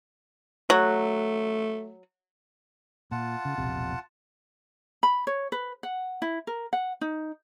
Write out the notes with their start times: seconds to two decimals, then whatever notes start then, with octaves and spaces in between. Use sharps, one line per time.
0.70 F#3 A3
3.11 A#2 F4 F#5 A5
3.45 C#3
3.58 E1 A#1 C3
5.03 B5
5.27 C#5
5.52 B4
5.83 F#5
6.22 E4
6.47 A#4
6.73 F#5
7.01 D#4